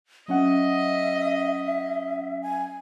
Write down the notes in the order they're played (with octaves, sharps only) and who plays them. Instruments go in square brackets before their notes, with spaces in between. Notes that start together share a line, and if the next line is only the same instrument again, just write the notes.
[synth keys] F#3 C#4 F#5 [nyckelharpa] D#5 [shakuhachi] E5
[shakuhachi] G#5